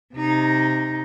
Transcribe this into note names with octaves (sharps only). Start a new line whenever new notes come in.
C3 D#4